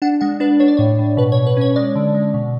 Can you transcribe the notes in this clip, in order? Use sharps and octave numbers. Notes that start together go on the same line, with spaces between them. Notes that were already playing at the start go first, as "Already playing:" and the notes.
D4 F#5
G#3 F#5
D4 B4
D4 C#5
D5
A2 C#5
A2
B2 B4
C#5
B2
B4
C#4 C#5
G#3 D5
D3
G#3
B2